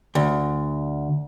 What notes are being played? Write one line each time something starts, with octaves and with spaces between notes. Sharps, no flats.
D2